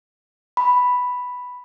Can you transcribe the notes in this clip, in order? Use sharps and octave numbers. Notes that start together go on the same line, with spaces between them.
B5